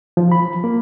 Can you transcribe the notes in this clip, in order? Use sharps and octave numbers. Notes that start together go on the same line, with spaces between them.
F3
B5
A#3